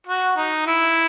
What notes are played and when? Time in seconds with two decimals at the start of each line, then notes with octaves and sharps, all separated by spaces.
0.07 F#4
0.37 D#4
0.67 E4